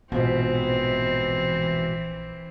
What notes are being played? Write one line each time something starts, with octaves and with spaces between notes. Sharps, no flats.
A#1 G#2 B2 E3 C4